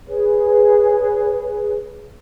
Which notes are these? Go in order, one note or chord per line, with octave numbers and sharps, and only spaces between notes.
G#4 B4 C#5